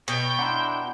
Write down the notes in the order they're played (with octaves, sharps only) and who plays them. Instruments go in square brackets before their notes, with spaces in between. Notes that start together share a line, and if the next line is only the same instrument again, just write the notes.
[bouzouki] B2 [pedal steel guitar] C#5 [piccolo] G5
[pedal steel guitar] D4 E4 [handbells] F#5 A#5 C6